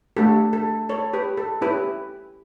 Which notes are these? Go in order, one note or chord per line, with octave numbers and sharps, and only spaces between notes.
A3 D4 G4 A4
A4
A4 C#5
G4 B4
A4
C#4 E4 G4 B4